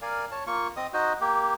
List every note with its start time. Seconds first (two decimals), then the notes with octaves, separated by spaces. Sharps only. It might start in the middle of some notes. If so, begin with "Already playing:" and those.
0.02 A#4 D5 F5 G#5
0.31 C#5 A5
0.47 A#3 F4 C#6
0.77 C4 D#5 D#6
0.94 D#4 F#4 C5 D#5
1.21 A#3 G4